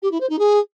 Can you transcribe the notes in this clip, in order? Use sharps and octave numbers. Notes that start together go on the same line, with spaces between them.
G4
E4
C5
D#4
G#4